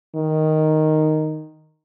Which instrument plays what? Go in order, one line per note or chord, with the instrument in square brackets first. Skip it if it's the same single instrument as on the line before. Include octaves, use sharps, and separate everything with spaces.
[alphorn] D#3